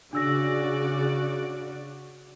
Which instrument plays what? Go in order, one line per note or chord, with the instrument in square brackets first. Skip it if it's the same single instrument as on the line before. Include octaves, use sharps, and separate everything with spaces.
[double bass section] C#3 [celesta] D4 E6 A#6 [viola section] F#4 D5